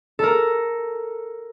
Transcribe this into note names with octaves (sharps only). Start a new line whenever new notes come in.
A4 A#4